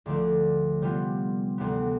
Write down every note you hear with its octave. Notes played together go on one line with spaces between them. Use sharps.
D2 D3 F3 A3 D4
C3 G3 B3 F4
D2 C3 E3 B3